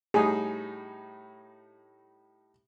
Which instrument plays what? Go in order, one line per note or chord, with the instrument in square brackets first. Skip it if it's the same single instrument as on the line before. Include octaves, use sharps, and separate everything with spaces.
[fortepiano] A2 G3 D#4 [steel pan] G#4